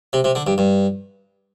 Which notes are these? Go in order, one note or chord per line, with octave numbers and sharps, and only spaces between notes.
C3
C3
D3
G2
G2